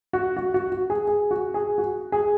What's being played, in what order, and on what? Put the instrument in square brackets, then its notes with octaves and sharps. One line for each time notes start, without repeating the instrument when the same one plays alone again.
[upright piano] F#4
F#4
F#4
F#4
G#4
G#4
F#4
G#4
F#4
G#4